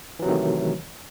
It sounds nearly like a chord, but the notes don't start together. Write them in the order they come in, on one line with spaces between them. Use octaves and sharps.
E3 F#3 C3 D#3 A3